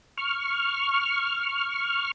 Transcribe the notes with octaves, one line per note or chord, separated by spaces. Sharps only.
C#6 F6